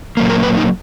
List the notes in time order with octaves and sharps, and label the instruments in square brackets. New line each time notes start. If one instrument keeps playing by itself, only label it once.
[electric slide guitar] A#2 F#3 A#3
A#4
B4
D#4